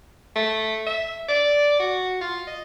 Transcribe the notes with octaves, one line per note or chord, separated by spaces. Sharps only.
A3
E5
D5
F#4
F4
D#5